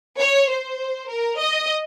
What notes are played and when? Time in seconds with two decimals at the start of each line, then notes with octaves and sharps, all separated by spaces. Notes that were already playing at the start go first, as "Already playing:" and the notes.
0.19 C#5
0.49 C5
1.08 A#4
1.38 D#5